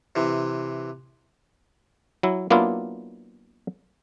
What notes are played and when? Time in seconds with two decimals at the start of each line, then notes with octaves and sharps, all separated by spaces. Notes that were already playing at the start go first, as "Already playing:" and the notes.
0.16 C3 E3
2.23 F#3 E4
2.50 F#3 A#3 B3 D4 E4 F4